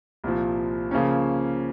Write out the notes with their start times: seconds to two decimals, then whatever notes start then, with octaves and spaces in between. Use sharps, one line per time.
0.24 C2 A#2 F3
0.91 C#3 F3 A#3 C#4